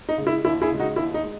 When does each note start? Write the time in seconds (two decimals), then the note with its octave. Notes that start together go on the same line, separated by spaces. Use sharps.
0.09 D#4
0.18 C#3 G#3
0.27 E4
0.45 D#2 E4
0.62 E4 G#4
0.70 C#3 G#3
0.79 D#4 F#4
0.96 D#2 E4
1.14 D#4
1.23 G#3